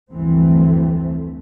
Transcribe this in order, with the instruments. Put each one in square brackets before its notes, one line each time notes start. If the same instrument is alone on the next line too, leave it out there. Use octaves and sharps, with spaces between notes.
[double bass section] F1 D2 G2 E3 A3 C4